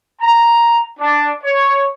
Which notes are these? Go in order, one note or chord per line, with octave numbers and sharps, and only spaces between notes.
A#5
D4
C#5